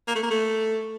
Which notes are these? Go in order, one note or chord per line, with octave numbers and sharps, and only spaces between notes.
A#3
A3
A#3
A3